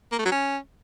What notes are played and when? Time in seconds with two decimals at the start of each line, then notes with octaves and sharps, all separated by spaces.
0.12 A#3
0.19 A3
0.25 F#3
0.32 C#4